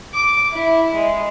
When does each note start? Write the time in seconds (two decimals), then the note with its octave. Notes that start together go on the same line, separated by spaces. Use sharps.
0.13 D6
0.52 E4
0.94 G#3